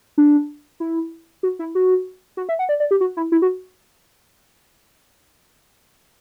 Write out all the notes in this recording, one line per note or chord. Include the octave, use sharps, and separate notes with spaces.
D4
E4
F#4
E4
F#4
F#4
E5
F#5
D5
D5
G4
F#4
E4
E4
F#4